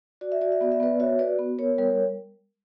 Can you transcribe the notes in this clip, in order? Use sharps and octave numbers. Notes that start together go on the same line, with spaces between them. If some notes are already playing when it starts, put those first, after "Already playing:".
F#4 D5
E5
F#4 D5
E5
B3 D5
E5
B3 B4 D5
F#4 C#5 E5
F#4 B4 D5
B3
B3 A#4 C#5
G3 A#4 C#5